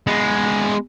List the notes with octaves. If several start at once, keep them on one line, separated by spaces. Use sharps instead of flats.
G#3 B3